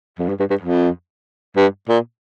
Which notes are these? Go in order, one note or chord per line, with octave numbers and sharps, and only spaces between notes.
F2
G2
G2
G2
F2
G2
A#2